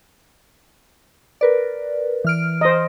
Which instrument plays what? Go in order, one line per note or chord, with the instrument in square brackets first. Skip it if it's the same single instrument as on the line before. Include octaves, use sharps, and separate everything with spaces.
[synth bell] A#4 B4 D5
E3 F6 D7
[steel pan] C5 D#5